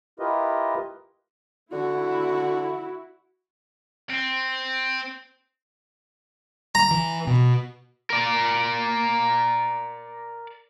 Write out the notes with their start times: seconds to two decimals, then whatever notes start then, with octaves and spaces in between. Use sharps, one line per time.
0.19 E4 F4 G4 A#4 B4 D#5
1.72 D3 E4 F#4
4.10 C4
6.75 A#5
6.91 E3
7.27 B2
8.10 A#4 D5